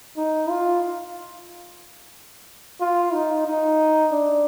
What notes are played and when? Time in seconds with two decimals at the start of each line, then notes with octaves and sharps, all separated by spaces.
0.17 D#4
0.50 F4
2.81 F4
3.13 D#4
3.47 D#4
4.12 D4